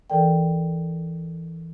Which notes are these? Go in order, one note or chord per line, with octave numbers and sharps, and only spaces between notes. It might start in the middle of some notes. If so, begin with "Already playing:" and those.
D2 E3 A4 A#4 D5 G5